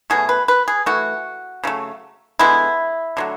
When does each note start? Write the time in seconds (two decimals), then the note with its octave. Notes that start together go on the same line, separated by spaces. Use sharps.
0.10 B2 F#3 A3 G#4
0.29 B4
0.48 B4
0.68 G#4
0.86 E3 A3 F#4
1.64 C#3 F#3 A3
2.39 D3 G#3 B3 E4
3.17 D3 F#3 A3